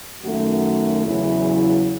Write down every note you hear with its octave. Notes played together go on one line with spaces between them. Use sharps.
F#2 D#3 A3 C#4 F#4
E2 C#3 F#3 E4